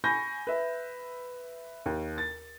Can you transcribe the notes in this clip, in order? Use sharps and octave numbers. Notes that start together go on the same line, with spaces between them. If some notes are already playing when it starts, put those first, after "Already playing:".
G#5 B5 C#6 G6 A#6
B4 E5
D#2
A6